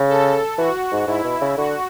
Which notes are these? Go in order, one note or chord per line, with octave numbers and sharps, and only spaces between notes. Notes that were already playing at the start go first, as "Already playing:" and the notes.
Already playing: C#3
A4
E3 F#4
G#2
G#2 E4
B2
C#3
D3 F#4